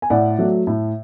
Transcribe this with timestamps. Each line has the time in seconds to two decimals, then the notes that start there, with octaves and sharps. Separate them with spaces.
0.02 G#5
0.10 A2 D5 F#5
0.39 F#3 A3
0.67 A2